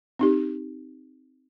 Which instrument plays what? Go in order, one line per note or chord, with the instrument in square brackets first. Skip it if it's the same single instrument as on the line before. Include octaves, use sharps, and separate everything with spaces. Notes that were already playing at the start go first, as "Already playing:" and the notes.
[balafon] C4 D#4 G4